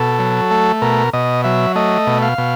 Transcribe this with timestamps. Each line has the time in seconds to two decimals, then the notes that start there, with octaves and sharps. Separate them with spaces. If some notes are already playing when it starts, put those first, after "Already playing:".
Already playing: B2 A4
0.19 F#3
0.51 A3
0.82 B2 A#4
1.13 B2 D#5
1.44 F#3 E5
1.75 A3 D#5
2.07 B2
2.22 F5
2.38 B2